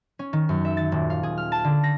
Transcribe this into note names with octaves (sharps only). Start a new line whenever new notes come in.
C#4
D#3
F#2
E5
A6
D#1
F5
G#4
F6
A5
D3
A#6